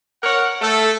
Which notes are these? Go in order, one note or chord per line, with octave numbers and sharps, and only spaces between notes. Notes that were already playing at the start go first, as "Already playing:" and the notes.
A#4 C#5 F#5
A3 A4